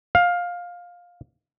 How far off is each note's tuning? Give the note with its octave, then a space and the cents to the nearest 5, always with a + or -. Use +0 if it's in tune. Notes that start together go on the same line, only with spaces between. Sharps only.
F5 +15